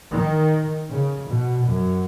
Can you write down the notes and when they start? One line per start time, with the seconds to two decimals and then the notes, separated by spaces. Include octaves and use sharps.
0.11 D#3
0.89 C#3
1.27 B2
1.66 F#2